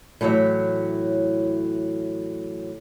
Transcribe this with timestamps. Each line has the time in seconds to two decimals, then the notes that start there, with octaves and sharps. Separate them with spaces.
0.21 A2 E3 F#3 C#5 E5